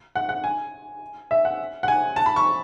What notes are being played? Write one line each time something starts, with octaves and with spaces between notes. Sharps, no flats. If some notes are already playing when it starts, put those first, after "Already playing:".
F#5
F#5
G#5
E5
F#5
F#5
G#5
A5
B5
C#6